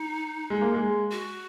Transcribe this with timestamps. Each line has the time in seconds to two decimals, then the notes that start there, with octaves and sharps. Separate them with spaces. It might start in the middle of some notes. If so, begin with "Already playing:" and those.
Already playing: D#4
0.50 G#3
0.62 A#3
0.74 G#3
1.11 F#4